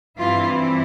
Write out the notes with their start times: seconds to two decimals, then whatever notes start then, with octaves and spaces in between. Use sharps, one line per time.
0.19 G2 E3 G3 C4 E4 F4